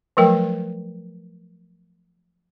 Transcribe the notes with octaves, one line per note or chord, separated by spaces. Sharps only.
F3 F#3 A3 A#4 G5